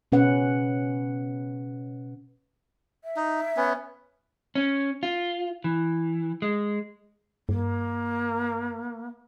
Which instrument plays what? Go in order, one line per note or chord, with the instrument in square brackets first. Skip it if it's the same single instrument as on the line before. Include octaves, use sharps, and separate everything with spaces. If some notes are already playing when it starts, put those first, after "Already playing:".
[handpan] B2 C#4 B4 F#5
[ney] E5
[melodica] D#4
B3 C#4
[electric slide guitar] C#4
F4
E3
G#3
[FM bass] G2 [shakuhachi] A#3